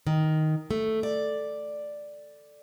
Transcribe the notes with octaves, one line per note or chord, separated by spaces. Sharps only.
D#3
A3
D5